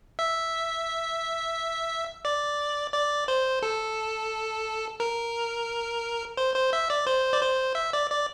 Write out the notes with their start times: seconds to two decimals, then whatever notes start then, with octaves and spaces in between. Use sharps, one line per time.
0.19 E5
2.25 D5
2.94 D5
3.28 C5
3.62 A4
5.00 A#4
6.37 C5
6.56 C5
6.73 E5
6.90 D5
7.07 C5
7.33 D5
7.42 C5
7.75 E5
7.93 D5
8.10 D5